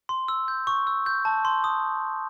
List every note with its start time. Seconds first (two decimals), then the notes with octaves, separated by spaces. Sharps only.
0.09 C6
0.28 E6
0.48 G6
0.67 C#6
0.87 E6
1.06 G6
1.25 A5
1.45 C6
1.64 D#6